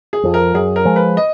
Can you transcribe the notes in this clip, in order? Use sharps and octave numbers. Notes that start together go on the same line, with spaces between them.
G#4
F2 F3
A#4
F#2 G#4
A#4
F3 G#3
B4
D#5